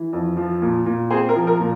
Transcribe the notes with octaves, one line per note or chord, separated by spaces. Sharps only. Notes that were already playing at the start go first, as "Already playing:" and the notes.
Already playing: E3
F2
F3
A#2
A#2
C4 G#4 C5
A#4
F3
A#4
A#2